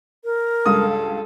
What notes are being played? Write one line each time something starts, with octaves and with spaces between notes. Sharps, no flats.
A#4
C#2 G2 A4 D#6